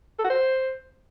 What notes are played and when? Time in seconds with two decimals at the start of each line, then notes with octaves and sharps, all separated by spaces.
0.19 A4
0.24 F#4
0.30 C5